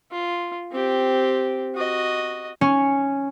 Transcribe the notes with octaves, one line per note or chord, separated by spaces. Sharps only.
F4
C4 G4
F#4 D#5
C#4